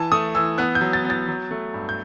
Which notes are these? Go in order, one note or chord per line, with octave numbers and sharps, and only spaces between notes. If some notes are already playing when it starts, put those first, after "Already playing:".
Already playing: E3 A5
A3 D#6
E3 E6
B3 F#6
G6
F#3
A6
B3
A6
F#3
A3
G2
G6